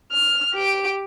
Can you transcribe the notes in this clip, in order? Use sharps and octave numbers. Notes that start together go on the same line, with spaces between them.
F6
G4 D7